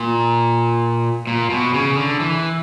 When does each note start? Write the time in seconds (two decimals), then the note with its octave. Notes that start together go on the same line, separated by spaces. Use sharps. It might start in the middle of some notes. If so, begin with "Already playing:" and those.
Already playing: A#2
1.27 A#2
1.50 B2
1.74 C#3
1.96 D3
2.20 E3